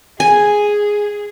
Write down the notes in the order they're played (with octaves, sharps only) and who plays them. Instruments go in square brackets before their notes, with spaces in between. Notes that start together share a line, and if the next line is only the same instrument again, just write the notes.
[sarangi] G#4 [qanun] G#5